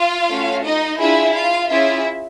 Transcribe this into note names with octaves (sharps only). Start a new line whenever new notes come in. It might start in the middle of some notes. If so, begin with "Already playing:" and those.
Already playing: F4 F5
A3 C#4 F#4
D#4 D#5
D4 E4 F4 G#4 E5
F4 F5
C#4 E4 F4 G#4 E5